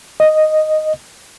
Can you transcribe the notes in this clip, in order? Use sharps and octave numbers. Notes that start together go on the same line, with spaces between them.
D#5